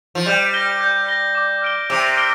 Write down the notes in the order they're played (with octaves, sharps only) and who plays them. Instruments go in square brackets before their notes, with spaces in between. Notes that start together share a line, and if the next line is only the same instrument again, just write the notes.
[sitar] F3
[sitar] G3 [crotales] G6
[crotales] A#6 G7
G6
A#6 G7
D6
F6 D7 G7
[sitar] C3 [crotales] D6
[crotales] F6 D7 G7